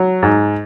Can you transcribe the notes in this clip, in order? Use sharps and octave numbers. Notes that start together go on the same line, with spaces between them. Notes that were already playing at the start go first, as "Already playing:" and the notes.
Already playing: F#3
G#2